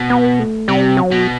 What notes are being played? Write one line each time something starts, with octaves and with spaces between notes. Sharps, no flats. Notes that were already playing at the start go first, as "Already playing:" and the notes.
Already playing: B2
B3
A3
C3 G3
F#3
B2